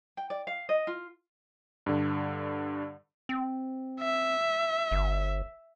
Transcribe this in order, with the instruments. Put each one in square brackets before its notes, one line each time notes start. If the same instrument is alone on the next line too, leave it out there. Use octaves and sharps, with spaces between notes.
[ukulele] G5
D5
F5
D#5
F4
[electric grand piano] G2 D3
[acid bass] C4
[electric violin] E5
[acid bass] G1